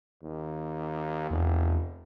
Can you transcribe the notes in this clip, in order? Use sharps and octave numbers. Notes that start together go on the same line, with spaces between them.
D#2
F1 E2